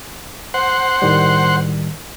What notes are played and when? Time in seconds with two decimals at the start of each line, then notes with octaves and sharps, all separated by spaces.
0.54 C5 F#5
1.02 A2 D#3 G3